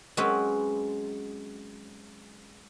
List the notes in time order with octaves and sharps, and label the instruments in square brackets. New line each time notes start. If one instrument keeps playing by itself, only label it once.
[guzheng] F#3 G#3 C4 C#4 B4